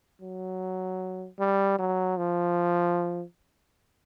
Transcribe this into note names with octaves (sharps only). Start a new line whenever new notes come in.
F#3
G3
F#3
F3